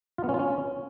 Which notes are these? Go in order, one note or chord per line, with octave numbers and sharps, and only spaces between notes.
F4
B3
C#4
F4
C#4